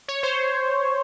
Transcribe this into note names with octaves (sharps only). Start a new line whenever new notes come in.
C#5
C5